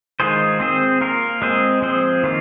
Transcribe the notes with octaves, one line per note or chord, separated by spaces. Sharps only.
D#3 G#3 F4 G#4 C5
C4 G#4 C5
A#3 F4 A#4
G#3 C4 G#4 C5
F3 C4 G#4 C5
D#3 A#3 F4